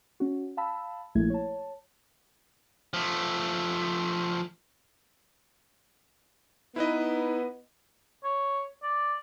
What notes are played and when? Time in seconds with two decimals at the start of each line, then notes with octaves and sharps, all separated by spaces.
0.20 C#4 F#4
0.57 F5 A5 B5 E6
1.15 A#1 A3 E4 G#6
1.30 C#5 A5
2.94 F3 A3
6.76 B3 D#4 E4 B4 D#5
8.24 C#5
8.83 D5